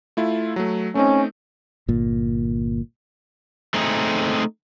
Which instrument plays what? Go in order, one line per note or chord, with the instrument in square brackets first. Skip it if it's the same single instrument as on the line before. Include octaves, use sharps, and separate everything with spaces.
[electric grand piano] A3 E4 F4
F#3 A3
[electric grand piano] A3 C4 D#4 [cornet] C#4
[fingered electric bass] G1 A#2
[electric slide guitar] A3 C4 D#4 G#4